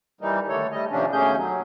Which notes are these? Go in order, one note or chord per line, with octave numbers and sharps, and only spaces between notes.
E3 G3 A#3 D#4
D3 D#3 A3 A4 C#5
G3 A3 D#5
C3 D#3 F3 A#3 C#4 D4
D#2 B2 A3 C#4 G#4 G6
F#3